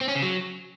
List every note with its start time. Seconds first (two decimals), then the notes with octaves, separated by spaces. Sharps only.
0.01 C4
0.08 C#4
0.15 C#3
0.22 F#3